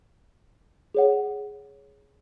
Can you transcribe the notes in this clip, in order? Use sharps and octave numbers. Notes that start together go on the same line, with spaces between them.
G#4 C#5 F#5